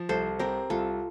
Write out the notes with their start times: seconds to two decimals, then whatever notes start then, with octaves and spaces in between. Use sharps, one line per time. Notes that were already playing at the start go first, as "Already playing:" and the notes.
Already playing: F3
0.09 C2 A4 C5
0.39 C4 G4 A#4
0.70 C2 F4 A4